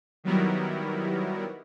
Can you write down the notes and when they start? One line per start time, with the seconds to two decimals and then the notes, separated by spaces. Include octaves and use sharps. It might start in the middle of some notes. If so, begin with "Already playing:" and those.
0.24 D#3 F#3 G3 B3 E4 A#4